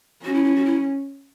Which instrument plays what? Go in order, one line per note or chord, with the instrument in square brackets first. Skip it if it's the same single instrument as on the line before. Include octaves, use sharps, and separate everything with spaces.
[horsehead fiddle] C#4 [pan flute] F#4
[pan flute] E4
E4
F#4
E4